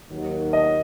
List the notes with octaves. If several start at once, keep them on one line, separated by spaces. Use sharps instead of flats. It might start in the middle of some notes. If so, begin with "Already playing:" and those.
D#2 D#3 F#3
D#5